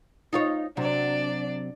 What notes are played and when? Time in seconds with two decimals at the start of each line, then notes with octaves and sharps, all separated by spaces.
0.33 D#4 F4 C#5
0.77 C3 F#3 D4 D5